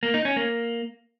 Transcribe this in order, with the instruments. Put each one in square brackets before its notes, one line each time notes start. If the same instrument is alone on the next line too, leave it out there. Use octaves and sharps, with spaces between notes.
[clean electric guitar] A#3
D#4
C#4
A#3